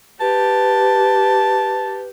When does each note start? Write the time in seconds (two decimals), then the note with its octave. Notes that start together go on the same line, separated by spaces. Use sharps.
0.20 G4 B4 A5